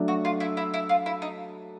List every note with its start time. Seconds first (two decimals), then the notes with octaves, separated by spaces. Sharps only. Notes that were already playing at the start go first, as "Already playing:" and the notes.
Already playing: F#3 A3 D4
0.08 F#4
0.25 F4
0.40 E4
0.57 E4
0.74 E4
0.89 F4
1.06 E4
1.22 D#4